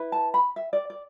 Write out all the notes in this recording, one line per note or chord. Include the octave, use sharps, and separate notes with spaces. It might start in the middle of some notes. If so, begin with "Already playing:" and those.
Already playing: E4 B4
A5
B5
E5
D5
D5